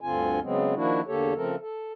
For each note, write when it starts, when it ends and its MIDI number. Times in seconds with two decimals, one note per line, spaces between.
0.01 0.40 38
0.01 0.40 43
0.01 0.40 50
0.01 0.40 60
0.01 0.40 65
0.01 0.40 80
0.43 0.75 49
0.43 0.75 54
0.43 0.75 56
0.43 0.75 59
0.43 0.75 60
0.75 1.01 51
0.75 1.01 53
0.75 1.01 58
0.75 1.01 62
0.75 1.01 64
0.75 1.01 66
1.07 1.34 40
1.07 1.34 50
1.07 1.34 58
1.07 1.34 67
1.07 1.34 69
1.07 1.34 73
1.36 1.56 49
1.36 1.56 53
1.36 1.56 57
1.36 1.56 60
1.36 1.56 69
1.36 1.56 70
1.61 1.93 69